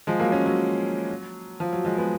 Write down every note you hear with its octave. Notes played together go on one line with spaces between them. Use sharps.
F3 G#3
F#3 A#3
A#3 C#4
F#3
F3
F#3
F3 G#3
G#3 B3